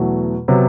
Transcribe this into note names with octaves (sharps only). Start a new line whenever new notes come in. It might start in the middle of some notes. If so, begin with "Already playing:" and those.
Already playing: E2 B2 F#3 A3
C3 F#3 B3